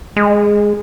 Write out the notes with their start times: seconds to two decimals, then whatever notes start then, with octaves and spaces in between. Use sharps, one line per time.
0.16 G#3